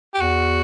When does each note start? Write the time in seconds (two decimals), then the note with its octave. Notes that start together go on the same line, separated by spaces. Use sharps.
0.14 G4
0.20 E2 F#4